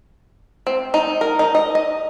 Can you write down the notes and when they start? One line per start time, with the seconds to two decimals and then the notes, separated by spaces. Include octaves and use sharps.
0.67 C4
0.94 D#4
1.21 A#4
1.39 D#4
1.55 D#5
1.75 D#5